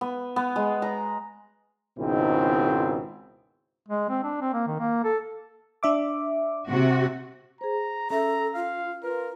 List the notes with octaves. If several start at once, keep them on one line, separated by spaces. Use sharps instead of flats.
B3
B3
G#3
A#5
C#2 G#2 B2 D#3 C4 E4
G#3
C4
D4
C4
A#3
D#3
A#3
A4
D4 E5 D6
C3 F#4
G#4 C5 A#5
C#4 A4 E5 A#5 A#6
F4 F5
F4 A#4 B4